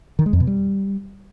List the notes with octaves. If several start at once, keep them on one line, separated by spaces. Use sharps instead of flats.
D#3
G#3
F2
B2
G3